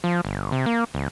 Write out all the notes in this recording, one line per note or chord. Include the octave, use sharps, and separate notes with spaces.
F3
G1
C3
A#3
C#2